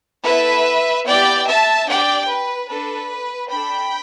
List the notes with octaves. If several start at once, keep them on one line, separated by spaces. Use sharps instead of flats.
B3 E4 A4 B4 E5
B3 E4 G4 D5 G5
E5 A5
D4 G4 D5 G5
B4
D4 A4 B4
D4 A4 G5 B5